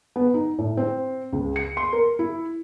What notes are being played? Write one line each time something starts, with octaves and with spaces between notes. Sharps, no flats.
B3
D#4
A2
C4
C#2
C#7
C6
A#4
E4